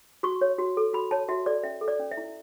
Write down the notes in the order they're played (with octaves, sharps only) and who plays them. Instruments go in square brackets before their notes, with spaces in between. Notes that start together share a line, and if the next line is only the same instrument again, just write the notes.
[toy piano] F#4 C#6
C#5
F#4
A4
F#4 B5
C#5 A5
F#4 E5
A4 D5
C#4 E5
A4
D5
C#4
E5
E4